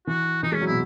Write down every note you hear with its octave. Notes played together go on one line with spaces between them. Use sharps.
E3 F#4
E3 D#4
G#3
C#4
F#3
B2 E4